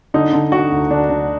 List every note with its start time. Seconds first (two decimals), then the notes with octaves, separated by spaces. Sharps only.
0.14 D3 D#4
0.33 D3
0.52 D3 F#4
0.71 D2
0.90 D3 D4
1.10 D3